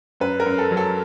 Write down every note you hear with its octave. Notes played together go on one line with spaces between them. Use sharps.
F#2 B4
A#4
F#2
A4
F#3
A4